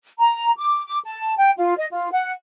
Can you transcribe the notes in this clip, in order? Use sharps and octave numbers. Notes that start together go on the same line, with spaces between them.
A#5
D6
D6
A5
G5
F4
D#5
F4
F#5